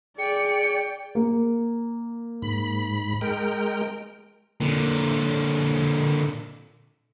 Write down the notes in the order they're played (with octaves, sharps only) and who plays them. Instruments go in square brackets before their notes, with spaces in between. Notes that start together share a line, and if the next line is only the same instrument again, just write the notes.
[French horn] G#4 [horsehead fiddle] D5 [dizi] G5 [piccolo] C#7
[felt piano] A#3
[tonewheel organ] G#2 B5
G#3 A#4 G5
[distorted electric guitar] A#2 D3